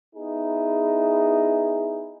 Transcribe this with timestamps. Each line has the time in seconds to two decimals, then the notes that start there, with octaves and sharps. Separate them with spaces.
0.15 B3 D#4 E4 G#4